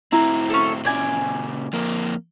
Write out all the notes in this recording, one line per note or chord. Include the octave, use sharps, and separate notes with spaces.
A2 C4 E4 A#5
C#4 A4
A#2 C#3 D5 G#5
F2 A#3